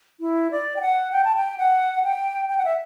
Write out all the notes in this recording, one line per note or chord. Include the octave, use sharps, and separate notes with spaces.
E4
D5
G5
F#5
G5
A5
G5
F#5
G5
G5
F#5
E5